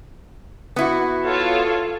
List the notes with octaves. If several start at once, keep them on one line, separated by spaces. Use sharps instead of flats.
B3 E4 F#4
F4 A4 C#5